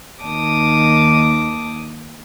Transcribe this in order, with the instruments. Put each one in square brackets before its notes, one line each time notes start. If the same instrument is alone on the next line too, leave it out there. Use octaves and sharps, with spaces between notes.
[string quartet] D#2 D#3 A5 D6 D#6